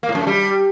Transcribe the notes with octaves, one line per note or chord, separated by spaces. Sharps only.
A#3
A2
F#2
A3
G3